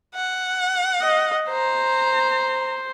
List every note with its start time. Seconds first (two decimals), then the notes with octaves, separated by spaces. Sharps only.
0.15 F#5
1.00 D#5
1.50 C5 A#5